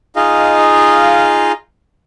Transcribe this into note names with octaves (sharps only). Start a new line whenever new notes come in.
D#4 F4 G#4 D#5 F5